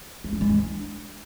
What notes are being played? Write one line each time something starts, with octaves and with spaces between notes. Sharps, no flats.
G#3
C#4
G#3
D4